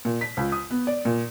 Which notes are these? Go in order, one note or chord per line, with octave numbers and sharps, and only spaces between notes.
A#2
B6
C#2
D#6
B3
D5
A#2